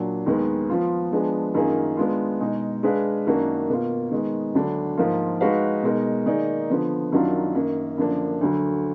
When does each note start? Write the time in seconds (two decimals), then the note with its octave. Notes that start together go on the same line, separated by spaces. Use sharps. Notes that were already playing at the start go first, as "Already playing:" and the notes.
Already playing: A#2 F#3 D4
0.26 D#2 D#3 G#3 B3
0.70 F3 B3 F4
1.12 F3 G#3 B3 D4 G#4
1.54 F#2 D#3 A#3 F4 G#4
1.97 G#3 B3 D4 F4
2.40 B2 G#3 D#4 G#4
2.83 G#3 D4 G#4 B4 F5
3.26 F#2 D#3 A#3 D4 F#4
3.69 B2 A#3 F4
4.11 D#3 G#3 B3
4.55 D2 D3 F#3 D4
4.97 G#2 F3 A#3 F4 A#4
5.41 G#3 D#4 F#4 B4 F5
5.83 B2 G#3 D#4 A#4
6.26 D#3 A#3 D#4 G#4 D5
6.69 D3 F3 B3
7.12 F#2 D#3 F#3 D4 F4
7.54 F#2 D#3 A#3
7.97 F#2 D3 F3 A#3 D4
8.41 D2 D3 F#3